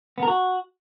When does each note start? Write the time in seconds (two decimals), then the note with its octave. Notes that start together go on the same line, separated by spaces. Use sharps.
0.18 B3
0.23 A#4
0.28 F#4